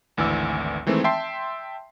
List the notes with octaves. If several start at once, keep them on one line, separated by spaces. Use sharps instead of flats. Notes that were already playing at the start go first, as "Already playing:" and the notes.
G#1 D2 E3 D5 E6
D#3 E3 G#3 A3 C4
E5 G5 A5 C6 C7